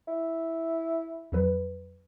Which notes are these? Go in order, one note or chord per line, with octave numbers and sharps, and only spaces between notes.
E4
F2 F#3 B4